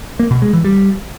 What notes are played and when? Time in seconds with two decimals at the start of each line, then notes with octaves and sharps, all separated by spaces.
0.19 A#3
0.31 B2
0.42 G#3
0.53 E3
0.65 G3